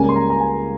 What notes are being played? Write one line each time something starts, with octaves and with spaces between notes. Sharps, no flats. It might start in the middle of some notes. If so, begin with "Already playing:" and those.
Already playing: C#2 C#3 G3 A#3 C#4 G#5
C6
A#5
A#5
G#5